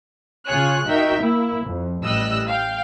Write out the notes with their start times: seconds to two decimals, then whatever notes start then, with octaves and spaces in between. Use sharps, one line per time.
0.47 C#3 F4 G#4 C#5 F#6
0.88 D#4 F#4 A#4 E5 G5
1.22 A#3 E4
1.64 F2
2.03 A1 G3 D#5 E6 F#6
2.47 F5 G5